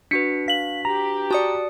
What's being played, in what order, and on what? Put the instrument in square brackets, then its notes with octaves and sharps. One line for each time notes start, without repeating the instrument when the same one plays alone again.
[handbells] D4 F#4 B4 [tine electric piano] B6 C#7
[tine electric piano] F5 [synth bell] B6 F#7
[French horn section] G4 [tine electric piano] A#5
[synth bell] F#4 D5 [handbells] A5 D#6 C#7